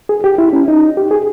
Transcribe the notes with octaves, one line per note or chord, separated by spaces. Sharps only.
G#4
G4
E4
C#4
D#4
G4
G#4